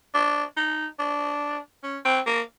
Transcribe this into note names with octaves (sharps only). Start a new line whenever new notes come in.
D4
D#4
D4
C#4
C4
A#3